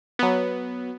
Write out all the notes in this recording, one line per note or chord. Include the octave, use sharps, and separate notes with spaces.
F#3 B3